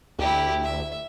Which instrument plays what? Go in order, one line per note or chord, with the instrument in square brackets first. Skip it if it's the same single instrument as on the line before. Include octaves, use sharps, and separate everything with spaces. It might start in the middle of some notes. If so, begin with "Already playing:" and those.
[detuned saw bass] D2 [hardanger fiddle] E4 G4
[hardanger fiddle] E5